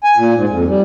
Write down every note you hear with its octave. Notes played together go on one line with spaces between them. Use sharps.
G#5
A#2
G#2
F2
G3